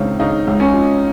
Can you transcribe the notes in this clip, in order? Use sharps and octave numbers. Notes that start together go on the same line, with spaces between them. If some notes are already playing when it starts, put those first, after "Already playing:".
Already playing: C#2 C#3 C4 D#4
C#3 D#4
C#2
C#4
F3